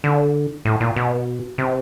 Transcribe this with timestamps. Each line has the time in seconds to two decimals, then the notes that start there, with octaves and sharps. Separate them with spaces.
0.04 D3
0.65 A2
0.80 A#2
0.96 B2
1.58 C3